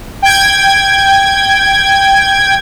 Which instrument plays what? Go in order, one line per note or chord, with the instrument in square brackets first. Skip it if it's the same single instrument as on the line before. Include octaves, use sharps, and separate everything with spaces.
[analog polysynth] G5 G#6